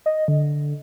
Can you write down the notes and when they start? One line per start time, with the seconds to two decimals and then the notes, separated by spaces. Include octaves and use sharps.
0.06 D#5
0.28 D3